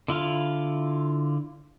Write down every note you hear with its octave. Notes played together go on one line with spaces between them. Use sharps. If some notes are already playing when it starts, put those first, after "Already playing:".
D3 E4 F4 F5